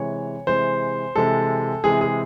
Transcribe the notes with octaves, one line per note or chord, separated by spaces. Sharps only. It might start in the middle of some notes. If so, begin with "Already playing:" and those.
Already playing: C3 E3 G#3 C#5
C3 E3 G#3 C5
C3 E3 G#3 A4
C3 E3 G#3 G#4
G#4